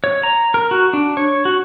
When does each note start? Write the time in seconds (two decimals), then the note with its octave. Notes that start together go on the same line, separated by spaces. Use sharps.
0.04 C#5
0.23 A#5
0.54 A#4
0.71 F#4
0.93 D4
1.17 C#5
1.45 F#4